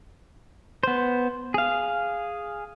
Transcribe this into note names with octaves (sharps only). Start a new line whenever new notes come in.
B3 C5
G#4 F5